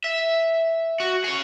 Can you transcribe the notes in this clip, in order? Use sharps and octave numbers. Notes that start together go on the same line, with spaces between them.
E5
F#4
G#4 C#5